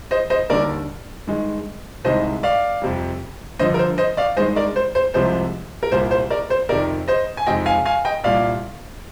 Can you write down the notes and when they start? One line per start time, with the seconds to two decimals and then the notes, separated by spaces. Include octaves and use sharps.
0.11 C5 D#5
0.30 C5 D#5
0.50 D#2 D3 G3 A#4 D5
1.27 G2 D#3 G#3
2.05 C2 C3 D#3 G#3 C5 D#5
2.43 D5 F5
2.82 F2 C3 G3
3.59 G2 D3 F3 C5 D#5
3.74 A#4
3.79 C5
3.98 C5 D#5
4.17 D5 F5
4.37 G2 D#3 G#3 C5 D#5
4.56 A#4 D5
4.76 C5
4.95 C5
5.14 C2 C3 F3 G#3 C5
5.83 A#4
5.92 C2 A#2 G3 C5
6.11 C5
6.30 A#4 D5
6.50 C5
6.69 F2 C3 D#3 A#4 D5
7.08 C5 D#5
7.37 G#5
7.46 F2 C3 D#3 G#3 D#5 G5
7.66 F5 G#5
7.86 F5 G#5
8.05 D#5 G5
8.24 C2 A#2 G3 D5 F5